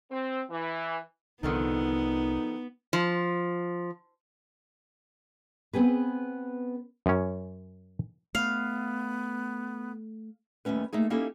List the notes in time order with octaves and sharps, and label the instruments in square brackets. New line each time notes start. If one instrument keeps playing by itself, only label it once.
[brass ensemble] C4
E3
[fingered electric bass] C2 [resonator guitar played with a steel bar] D3 D#3 F3 [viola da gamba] B3 [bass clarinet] D#4
[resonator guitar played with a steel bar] F3
[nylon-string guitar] B3 C4 G#4 B4
[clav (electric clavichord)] F#2 C#4
[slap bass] A3 [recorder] B3 [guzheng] F5
[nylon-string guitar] D#2 G3 A3 C#4 B4
A3 A#3 D#4 G#4
A#3 C#4 D#4 E4 G4 A4